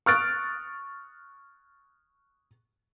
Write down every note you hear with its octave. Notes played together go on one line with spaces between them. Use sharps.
C#6 D#6 F6 F#6 A6 D7